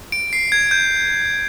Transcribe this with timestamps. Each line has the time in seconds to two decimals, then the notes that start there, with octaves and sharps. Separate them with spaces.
0.12 D7
0.33 C7
0.52 G#6
0.71 G6